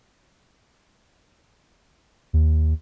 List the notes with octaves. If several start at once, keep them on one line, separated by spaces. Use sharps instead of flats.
D#2